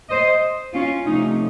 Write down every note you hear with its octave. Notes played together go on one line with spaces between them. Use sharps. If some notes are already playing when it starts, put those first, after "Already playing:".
C5 D#5
C#4 F4
C3 F3 A3 C#4 D#4